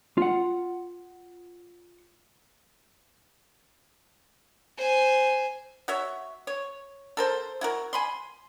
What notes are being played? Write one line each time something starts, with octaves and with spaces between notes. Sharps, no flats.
F4 F#5
C5 G#5
F#4 C#5 E5
C#5
A4 A#4 C5
E4 F#4 A#4
G#5 B5 C6